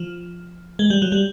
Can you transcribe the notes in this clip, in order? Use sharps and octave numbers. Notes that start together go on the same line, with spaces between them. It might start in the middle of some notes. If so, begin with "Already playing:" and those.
Already playing: F3
G#3
G3
F#3
G3